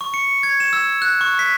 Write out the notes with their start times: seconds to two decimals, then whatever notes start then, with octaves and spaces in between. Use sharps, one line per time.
0.01 C#6
0.14 C#7
0.27 C#7
0.43 G#6
0.60 E7
0.73 E6
1.02 F#6
1.21 C#6
1.39 B6